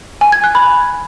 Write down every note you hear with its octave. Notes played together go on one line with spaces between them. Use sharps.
G#5
G#6
F#6
B5